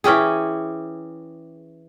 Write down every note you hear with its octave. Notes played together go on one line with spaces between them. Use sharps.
E3 C#4 G4 G#4